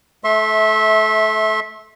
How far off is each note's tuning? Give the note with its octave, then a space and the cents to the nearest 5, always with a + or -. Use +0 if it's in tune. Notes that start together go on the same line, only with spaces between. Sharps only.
A3 -25 E5 -15 C6 +35